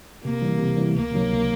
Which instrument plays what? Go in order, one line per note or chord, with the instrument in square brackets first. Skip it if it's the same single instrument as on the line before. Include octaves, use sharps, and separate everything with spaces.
[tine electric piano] C3 [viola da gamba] A#3
[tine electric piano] E3 G3
C3
E3 G3
[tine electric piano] C#2 [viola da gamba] A#3
[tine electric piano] C3 D#3 F#3
C#2